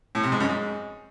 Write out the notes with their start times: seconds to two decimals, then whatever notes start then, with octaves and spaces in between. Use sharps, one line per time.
0.15 A2
0.23 C3
0.32 G#2
0.40 F#2
0.49 G#2